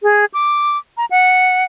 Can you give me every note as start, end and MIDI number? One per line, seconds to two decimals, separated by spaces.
0.03 0.25 68
0.34 0.77 86
0.97 1.05 82
1.11 1.64 78